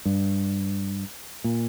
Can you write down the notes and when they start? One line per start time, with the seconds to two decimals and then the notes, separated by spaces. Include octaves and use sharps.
0.05 G2
1.44 A#2